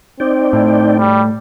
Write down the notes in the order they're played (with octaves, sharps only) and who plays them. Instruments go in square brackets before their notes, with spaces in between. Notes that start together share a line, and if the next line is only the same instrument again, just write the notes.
[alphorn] C4 [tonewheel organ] D#4 D5 G5
[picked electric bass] A2
[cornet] G3